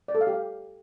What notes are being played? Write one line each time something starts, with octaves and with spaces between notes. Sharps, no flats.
D5
A4
F5
G4
F5